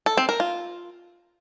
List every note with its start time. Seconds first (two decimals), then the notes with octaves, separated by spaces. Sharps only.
0.06 A4
0.17 C4
0.29 A#4
0.40 F4